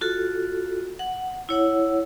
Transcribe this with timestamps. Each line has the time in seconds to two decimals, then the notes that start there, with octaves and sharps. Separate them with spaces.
0.01 F4 F#4 A4
0.99 F#5
1.49 E4 C#5 F#5